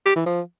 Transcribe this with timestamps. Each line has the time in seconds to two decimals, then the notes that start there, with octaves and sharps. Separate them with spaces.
0.06 G4
0.16 E3
0.26 F3